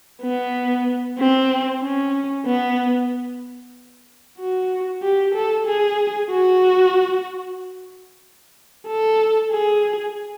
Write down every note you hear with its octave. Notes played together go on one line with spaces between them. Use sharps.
B3
C4
C#4
B3
F#4
G4
A4
G#4
F#4
A4
G#4